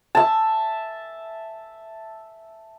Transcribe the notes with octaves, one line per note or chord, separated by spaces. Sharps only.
E5 A5